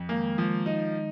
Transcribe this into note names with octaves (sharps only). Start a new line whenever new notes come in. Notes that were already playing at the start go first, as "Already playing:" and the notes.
Already playing: F2
D#3 G#3 A#3
D#3 F3 G#3
D#4
D#3 G#3